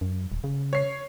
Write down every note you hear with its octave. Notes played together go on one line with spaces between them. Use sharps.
F#2
D#1
C#3
C#5 C7